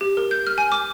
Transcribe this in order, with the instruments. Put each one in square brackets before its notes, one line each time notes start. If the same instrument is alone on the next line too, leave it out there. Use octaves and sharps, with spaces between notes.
[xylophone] G4
A#4
G6
F6
G#5
D6